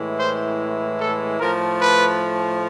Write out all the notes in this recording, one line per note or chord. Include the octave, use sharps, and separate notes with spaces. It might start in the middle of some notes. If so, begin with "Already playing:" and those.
Already playing: A2 E3 G#3
C5
A4
A2 F3 A3 A#4
B4